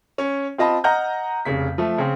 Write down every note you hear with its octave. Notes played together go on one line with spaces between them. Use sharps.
C#4 C#5
C4 F4 D#5 A5 B5
D#5 F#5 A#5 F6 G6
F1 C#3 B6
F3 A3
C#3 C4